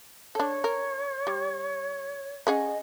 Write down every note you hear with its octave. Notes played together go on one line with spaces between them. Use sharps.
D4 A4 C#5
A#4
G3
C#4 G#4 D#5 F#5